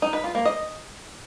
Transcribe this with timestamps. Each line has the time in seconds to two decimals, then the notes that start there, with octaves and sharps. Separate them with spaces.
0.02 D#4
0.13 B4
0.24 F4
0.35 A#3
0.45 D#5